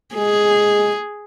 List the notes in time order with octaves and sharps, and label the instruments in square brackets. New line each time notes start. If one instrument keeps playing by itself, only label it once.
[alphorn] G#3 [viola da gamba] G#4